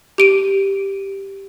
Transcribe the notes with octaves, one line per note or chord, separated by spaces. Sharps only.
G4 D7 D#7